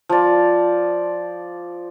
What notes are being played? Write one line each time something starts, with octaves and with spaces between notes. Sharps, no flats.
F3 D5